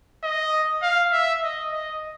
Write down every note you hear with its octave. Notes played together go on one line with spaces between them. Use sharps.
D#5
F5
E5
D#5
D#5